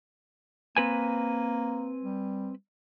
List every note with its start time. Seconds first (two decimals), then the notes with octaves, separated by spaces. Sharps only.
0.76 A#3 C4 B4 G#5
2.03 G3